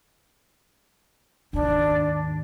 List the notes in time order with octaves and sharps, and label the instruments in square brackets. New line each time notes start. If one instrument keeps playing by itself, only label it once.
[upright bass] D#2 G#2 [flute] D4